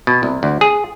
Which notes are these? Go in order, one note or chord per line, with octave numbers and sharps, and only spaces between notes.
B2
C2
D2
G#4